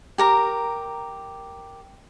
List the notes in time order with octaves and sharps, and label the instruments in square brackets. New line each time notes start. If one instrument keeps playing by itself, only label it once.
[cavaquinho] G4 A#4 A#5